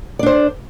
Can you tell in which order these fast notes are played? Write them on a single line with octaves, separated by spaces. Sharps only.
D5 D4 C5